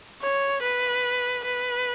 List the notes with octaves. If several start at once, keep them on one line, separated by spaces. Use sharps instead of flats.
C#5
B4
B4